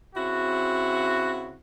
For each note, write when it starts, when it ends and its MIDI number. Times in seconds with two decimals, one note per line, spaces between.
0.16 1.57 49
0.16 1.57 60
0.16 1.57 64
0.16 1.57 66